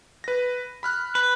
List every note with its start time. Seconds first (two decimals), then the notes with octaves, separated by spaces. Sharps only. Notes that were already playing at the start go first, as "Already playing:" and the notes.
0.24 B4 A#6
0.83 B5 F6 F#6
1.15 B4